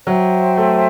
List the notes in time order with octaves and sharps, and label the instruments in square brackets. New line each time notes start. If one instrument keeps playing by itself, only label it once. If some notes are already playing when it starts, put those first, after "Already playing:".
[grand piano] F#3 [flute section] C5 E5 G5
[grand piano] A3